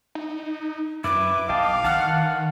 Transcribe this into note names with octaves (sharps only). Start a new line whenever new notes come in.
D#4
F#2 E4 B4 D6
B1 D#5 F5 G5 A5
D#3 F#5 A5 F6